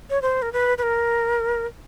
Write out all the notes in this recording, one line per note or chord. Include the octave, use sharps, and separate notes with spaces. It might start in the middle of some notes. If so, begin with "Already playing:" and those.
C#5
C5
A#4
B4
B4
A#4